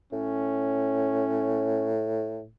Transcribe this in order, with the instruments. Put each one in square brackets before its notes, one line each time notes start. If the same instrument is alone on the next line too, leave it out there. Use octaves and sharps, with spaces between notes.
[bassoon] A2 [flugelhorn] C#4